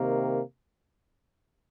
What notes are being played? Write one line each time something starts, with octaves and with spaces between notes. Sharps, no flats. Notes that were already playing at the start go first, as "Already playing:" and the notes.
Already playing: C3 D#3 A#3